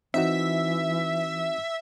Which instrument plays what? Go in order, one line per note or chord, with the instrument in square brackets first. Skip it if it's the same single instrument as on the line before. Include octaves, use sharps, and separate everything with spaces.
[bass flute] E3 [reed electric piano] C4 D#4 F#4 [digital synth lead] E5